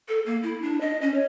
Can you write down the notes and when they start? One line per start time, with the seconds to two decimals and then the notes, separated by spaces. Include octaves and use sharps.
0.09 A4
0.26 A#3
0.43 E4
0.62 D4
0.81 D#5
1.02 C#4
1.14 C#5